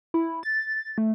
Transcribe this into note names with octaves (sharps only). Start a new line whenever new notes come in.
E4
A6
A3